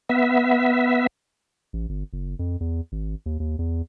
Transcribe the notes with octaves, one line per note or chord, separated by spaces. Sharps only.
B3 E5
A1
G1
F#1
F2
E2
G#1
D#2
D#2
E2